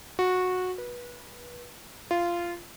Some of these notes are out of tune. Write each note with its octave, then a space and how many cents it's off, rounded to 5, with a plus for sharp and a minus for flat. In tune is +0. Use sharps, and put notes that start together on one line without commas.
F#4 -15
B4 -25
F4 -15